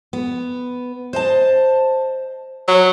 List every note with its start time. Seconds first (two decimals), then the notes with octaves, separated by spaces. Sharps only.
0.13 B3
1.13 C5 D#5 A5
2.68 F#3